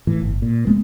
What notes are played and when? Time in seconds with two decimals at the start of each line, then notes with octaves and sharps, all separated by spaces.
0.07 A2 E3
0.21 G1
0.42 A#2
0.66 F1 G#3 A3 B3